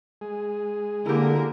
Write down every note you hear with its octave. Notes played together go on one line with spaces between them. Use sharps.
G#3 G#4
D3 A#3 E4 G4 A#4